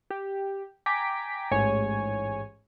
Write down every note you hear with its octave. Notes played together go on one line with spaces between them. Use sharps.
G4
G5 G#5 A#5 D6 B6
A1 G#2 C#5 G#5